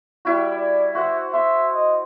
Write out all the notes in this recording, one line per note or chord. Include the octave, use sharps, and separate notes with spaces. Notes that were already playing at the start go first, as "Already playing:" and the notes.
G3 E4 F#4
D5
F#4 C5 E5 F#5
E5 C6
D#5